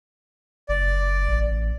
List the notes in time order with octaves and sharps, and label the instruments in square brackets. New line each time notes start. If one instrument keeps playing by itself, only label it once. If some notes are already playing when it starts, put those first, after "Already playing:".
[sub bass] F#1 [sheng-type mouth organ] D5
[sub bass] A1